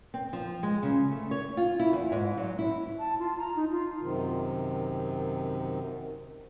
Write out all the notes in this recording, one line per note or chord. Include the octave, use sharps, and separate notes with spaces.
C4
F3
G#3
C#3
A3
C#5
F4
E4
E2
G#2
F#3
E4
A5
F4
A#5
D#4
F4
F#2 C3 D#3